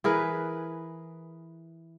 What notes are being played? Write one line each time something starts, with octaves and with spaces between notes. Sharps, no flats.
E3 G#4 A#4 B4